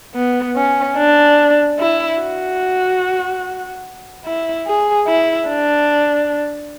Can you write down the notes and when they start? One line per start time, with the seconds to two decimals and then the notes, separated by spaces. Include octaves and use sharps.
0.15 B3
0.56 C#4
0.97 D4
1.79 E4
2.20 F#4
4.25 E4
4.67 G#4
5.07 E4
5.48 D4